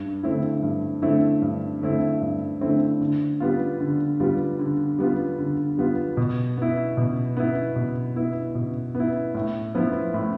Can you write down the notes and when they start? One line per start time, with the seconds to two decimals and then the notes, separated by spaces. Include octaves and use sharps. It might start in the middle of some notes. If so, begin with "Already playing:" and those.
Already playing: G2
0.23 D3 A3 C4 E4
0.63 G2
1.02 D3 A3 C4 E4
1.42 G2
1.81 D3 A3 C4 E4
2.21 G2
2.61 D3 A3 C4 E4
3.01 D3
3.40 G3 B3 F4
3.80 D3
4.20 G3 B3 F4
4.59 D3
4.99 G3 B3 F4
5.39 D3
5.78 G3 B3 F4
6.17 B2
6.57 B3 E4
6.97 B2
7.37 B3 E4
7.76 B2
8.16 B3 E4
8.55 B2
8.95 B3
9.00 E4
9.35 A2
9.75 F3 B3 E4
10.14 A2